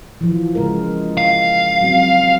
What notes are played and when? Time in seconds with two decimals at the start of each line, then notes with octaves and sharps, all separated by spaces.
0.21 E3 F3
0.55 C#3 G#3 A#4
1.17 F5
1.81 F#3 C4